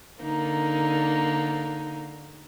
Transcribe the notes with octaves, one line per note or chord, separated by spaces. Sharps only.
D3 A#3 D#4